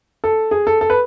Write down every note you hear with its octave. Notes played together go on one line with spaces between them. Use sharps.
A4
G#4
A4
A4
B4